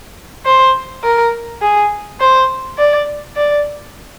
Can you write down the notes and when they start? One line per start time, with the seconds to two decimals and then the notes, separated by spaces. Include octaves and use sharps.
0.45 C5
1.04 A#4
1.61 G#4
2.20 C5
2.78 D5
3.36 D5